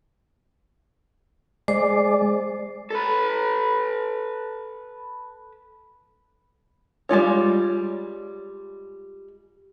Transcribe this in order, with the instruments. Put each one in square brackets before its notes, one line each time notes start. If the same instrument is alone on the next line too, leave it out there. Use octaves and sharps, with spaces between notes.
[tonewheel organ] G#3 D5 [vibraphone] C5
[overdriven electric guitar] A4 B4
[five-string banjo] G3 G#3 F4 C#5